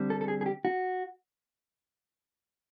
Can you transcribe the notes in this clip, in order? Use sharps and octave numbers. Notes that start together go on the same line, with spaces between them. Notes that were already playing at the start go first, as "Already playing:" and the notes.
Already playing: D3 G3 C4
A4
A4
G#4
G#4
G4
F#4